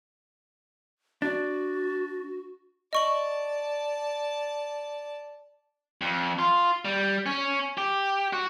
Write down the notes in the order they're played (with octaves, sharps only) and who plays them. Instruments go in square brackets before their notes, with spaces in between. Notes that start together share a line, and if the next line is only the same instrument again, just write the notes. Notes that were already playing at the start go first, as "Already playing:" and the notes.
[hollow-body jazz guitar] D4 [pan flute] F#4
[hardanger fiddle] D5 A5 [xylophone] D#5 C#6 F#7
[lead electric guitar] F2
F4
G3
C#4
G4
F#4